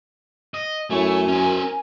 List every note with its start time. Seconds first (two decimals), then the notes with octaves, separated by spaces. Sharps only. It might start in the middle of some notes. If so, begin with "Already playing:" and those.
0.54 D#5
0.90 F#2 A3 E4 C#5 G#5
1.28 C#4 A#4 C5